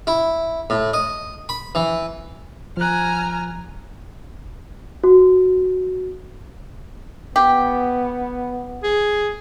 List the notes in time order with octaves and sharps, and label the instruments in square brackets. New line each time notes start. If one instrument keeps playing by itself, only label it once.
[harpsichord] E4
A2
D#5
B5
E3
[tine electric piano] F3 F#6 [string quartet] G#5 A#5 F6
[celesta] F#4
[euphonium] B3 [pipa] G4
[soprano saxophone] G#4